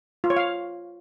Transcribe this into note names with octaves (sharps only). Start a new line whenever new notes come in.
F4
C#5
F5